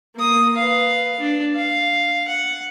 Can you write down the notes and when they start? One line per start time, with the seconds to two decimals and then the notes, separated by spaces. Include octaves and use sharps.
0.15 A#3 D#6
0.56 B4 F5
1.20 D4
1.56 F5
2.28 F#5